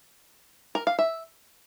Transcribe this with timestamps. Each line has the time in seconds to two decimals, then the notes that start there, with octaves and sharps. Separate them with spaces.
0.75 A#4
0.87 F5
0.99 E5